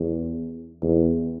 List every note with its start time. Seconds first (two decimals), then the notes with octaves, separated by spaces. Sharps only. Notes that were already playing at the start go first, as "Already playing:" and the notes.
Already playing: E2
0.83 E2